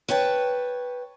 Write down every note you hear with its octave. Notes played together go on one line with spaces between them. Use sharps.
B4 C#5 G5 A5